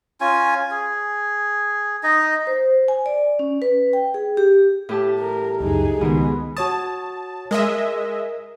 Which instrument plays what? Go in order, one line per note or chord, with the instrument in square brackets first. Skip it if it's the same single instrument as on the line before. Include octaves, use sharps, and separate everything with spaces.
[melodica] C#4 F4 G#5
G#4
D#4 D#5
[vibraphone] C5
G#5
D5
C#4
B4
G5
G#4
G4
[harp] A2 G4 A5
[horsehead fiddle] A#4
[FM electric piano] C#2 F#2 [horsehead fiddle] D#4 G#4
[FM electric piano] C#2 D#3 [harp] B2 B3 [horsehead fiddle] G#3
[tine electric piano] F#4 C#5 D#6 [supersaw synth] A5
[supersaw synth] G#3 D#5 E5 [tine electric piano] A#4